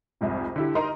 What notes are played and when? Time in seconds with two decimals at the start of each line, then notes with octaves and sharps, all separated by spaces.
0.21 C2 F2 G#2 C3
0.56 D3 E4 G4
0.75 D#4 A#4 D#5 A#5 C6